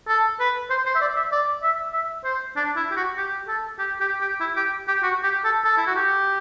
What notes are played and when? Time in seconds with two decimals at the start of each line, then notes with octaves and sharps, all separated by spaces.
0.08 A4
0.40 B4
0.70 C5
0.86 C5
0.95 E5
1.01 D5
1.16 E5
1.32 D5
1.63 E5
1.93 E5
2.24 C5
2.56 D4
2.76 E4
2.91 G4
2.96 F#4
3.17 G4
3.48 A4
3.79 G4
4.01 G4
4.21 G4
4.41 E4
4.57 G4
4.88 G4
5.03 F#4
5.23 G4
5.45 A4
5.65 A4
5.78 E4
5.87 F#4
5.96 G4